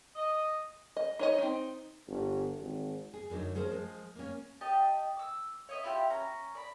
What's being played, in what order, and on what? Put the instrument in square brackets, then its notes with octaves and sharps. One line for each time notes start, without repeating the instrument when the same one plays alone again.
[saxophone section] D#5
[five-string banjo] D#5
D#4 C#5 D#5
C4 D#4
[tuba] G1
G#1
[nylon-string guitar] G#4
F#2 D3 F#3 D#4
F3 C#4 G#4 A#4 C5
F3 G#3
A#3 C#4
[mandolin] G4 D#5 G5 A5
D6 E6
C#5 D#5 E5
E4 F4 G4
C#4 A#5
D5 B5